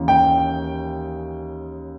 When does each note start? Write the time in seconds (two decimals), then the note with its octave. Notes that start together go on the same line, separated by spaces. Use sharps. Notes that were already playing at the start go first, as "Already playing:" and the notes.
Already playing: D#2 C#3 E3
0.08 G5